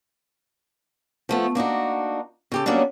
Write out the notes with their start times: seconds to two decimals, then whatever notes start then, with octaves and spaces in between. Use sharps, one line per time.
1.29 F3 A3 B3
1.55 A#3 D4 D#4 F#4
2.52 C#3 G4 A4
2.66 F#3 G3 A#3 B3 C#4 D4